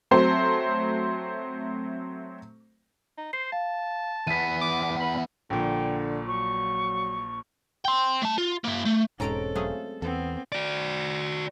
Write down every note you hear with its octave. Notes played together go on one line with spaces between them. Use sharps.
F#3 A3 C4 C5
D#4
C5 C7
F5 A5
E2 B3 B6 D#7
D6
B5
A#1 A#2 D3 G5
F#3 C#6
G5 C6
A3 A5
F4
A#3 E4
A3
E1 G#2 G#3 C4 C#4 A4 A#5 D7
F#3 A3 G#4 C5 F5
E2 B3 C4 A4
F#4 D5